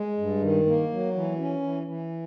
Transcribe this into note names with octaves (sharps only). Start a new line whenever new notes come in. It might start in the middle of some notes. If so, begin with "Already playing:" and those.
Already playing: G#3
G2
D#3
A#3
F#3
E3
C#4
E3
E3